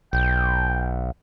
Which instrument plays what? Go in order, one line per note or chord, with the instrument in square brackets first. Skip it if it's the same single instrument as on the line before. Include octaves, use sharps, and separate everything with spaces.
[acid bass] B1 [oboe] G5